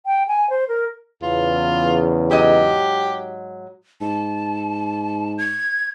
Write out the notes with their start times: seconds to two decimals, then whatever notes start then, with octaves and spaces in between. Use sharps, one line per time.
0.06 G5
0.28 G#5
0.50 C5
0.68 A#4
1.22 E2 C#3 F4
2.31 G#2 F#3 G4 D#5
4.01 G#2 A5
5.38 G#6